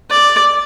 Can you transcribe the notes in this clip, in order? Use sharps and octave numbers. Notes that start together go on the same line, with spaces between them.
D5